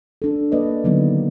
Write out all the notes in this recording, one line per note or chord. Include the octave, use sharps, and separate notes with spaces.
D4 A4
A#3 B4 D5 D#5
D3 D#3 F#3 A#3 B3